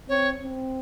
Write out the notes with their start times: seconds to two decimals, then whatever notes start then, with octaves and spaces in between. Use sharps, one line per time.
0.09 C4 C#5
0.42 C4